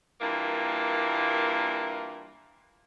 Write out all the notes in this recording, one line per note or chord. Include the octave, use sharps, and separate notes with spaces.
G2 A#2 E3 A#3